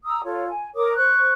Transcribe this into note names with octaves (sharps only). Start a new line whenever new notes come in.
A#5 D#6 E6
F4 A4 C#5
G#5
A#4 C#5 D6 D#6
C5 C#6 F#6